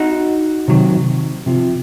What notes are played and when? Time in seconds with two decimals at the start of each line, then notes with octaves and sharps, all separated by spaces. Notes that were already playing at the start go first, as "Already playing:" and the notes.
Already playing: D#4 F#4
0.68 C3 D#3 F#3
1.46 C3 F3